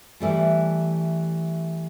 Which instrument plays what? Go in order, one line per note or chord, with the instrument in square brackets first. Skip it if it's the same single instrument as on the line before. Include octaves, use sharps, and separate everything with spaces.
[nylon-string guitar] E3 G3 A3